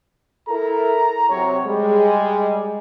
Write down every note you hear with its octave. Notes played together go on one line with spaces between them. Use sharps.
E4 A4 A#4 A#5
C3 F#3 C#5
G3 G#3